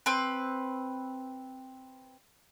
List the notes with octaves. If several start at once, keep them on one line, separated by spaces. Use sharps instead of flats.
C4 B4